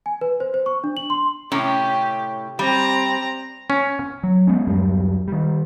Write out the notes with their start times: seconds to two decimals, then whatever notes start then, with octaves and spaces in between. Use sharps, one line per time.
0.06 G#5
0.21 B4
0.40 C5
0.54 C5
0.66 C#6
0.84 D4
0.97 F#7
1.10 C6
1.52 A2 C3 C#4 G4
2.59 G3 C4 A#5
3.70 C#4
4.23 F#3
4.47 G#3 B3 C#4
4.67 D1 F#2 G3
5.28 D#3 G3